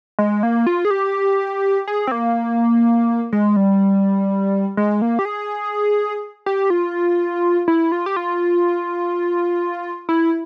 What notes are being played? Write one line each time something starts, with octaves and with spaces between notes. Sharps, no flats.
G#3
A#3
F4
G#4
G4
G#4
C4
A#3
G#3
G3
G#3
A#3
G4
G#4
G4
F4
E4
F4
G4
F4
E4